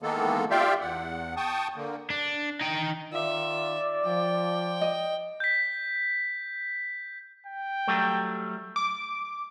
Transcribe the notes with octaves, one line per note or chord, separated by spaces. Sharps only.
D#3 E3 G#3 A#3 B3 A4
F4 G4 D5 E5 F5 G5
E2 F#5
G5 A5 C#6 D#6
D3 A#3
D4
D#4 G5
D#3 F4 D5 E5
F3 G5
D#5
G6 B6
G5
F#3 G3 A3
D6